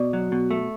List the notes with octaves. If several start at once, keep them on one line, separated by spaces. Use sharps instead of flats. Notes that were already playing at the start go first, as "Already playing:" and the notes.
Already playing: B2 D5
F#3
B2
A3